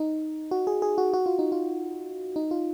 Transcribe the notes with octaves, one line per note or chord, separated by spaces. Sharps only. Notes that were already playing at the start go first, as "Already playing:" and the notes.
Already playing: D#4
F#4
G#4
G#4
F#4
F#4
F4
D#4
F4
D#4
F4